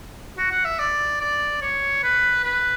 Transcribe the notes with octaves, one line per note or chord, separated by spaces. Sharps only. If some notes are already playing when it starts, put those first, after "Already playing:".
F#4
F#5
E5
D5
D5
C#5
B4
B4